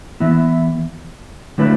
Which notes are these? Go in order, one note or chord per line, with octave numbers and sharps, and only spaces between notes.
E3 B3 E4
D3 F#3 A3 E4 B4